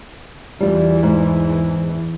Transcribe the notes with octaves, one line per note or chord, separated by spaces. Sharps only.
E2 E3 G3 F4
G#2